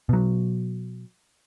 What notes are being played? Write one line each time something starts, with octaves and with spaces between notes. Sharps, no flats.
B2 F#3